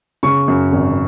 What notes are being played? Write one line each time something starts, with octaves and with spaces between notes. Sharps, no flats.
C#3 C#6
F#2
G#1